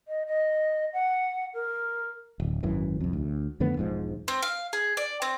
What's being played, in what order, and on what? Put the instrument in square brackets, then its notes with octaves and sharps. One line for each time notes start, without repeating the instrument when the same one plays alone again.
[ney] D#5
D#5
F#5
A#4
[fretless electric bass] D1
G#1 F#2 E3
C2 F2
D2
F2 D3 A3 B3
E1 G#2 F3
[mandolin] C4
F5
G#4
D5
C4